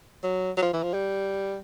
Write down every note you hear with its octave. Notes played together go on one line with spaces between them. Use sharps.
F#3
F#3
F3
E3
F3
G3